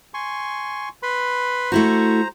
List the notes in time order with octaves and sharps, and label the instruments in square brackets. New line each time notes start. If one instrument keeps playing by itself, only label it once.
[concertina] G#5 C6 C#6
B4 B5 C6
[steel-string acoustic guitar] A3 E4 F#4 [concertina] C5 A#5